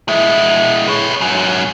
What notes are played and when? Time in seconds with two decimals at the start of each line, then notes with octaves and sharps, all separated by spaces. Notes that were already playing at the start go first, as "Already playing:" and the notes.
0.08 G#3 E4
0.88 B4 C#5
1.21 G#2 F#3